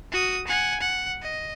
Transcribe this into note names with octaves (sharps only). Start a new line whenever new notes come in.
F#4 D#6
F#5 G#5
F#5
D#5